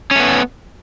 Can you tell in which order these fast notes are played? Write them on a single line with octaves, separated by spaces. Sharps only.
C#4 A3 B3